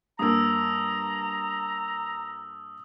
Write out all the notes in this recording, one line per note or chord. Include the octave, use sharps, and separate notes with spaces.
G2 A#3 A#5 D#6 E6